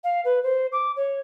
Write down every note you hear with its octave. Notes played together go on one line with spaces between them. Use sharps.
F5
B4
C5
D6
C#5